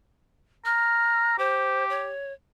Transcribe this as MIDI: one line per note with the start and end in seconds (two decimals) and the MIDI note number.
0.65 1.36 82
0.65 1.38 89
1.39 2.12 67
1.39 1.85 72
1.90 2.33 73